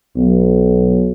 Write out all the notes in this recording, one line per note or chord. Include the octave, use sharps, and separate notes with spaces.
B1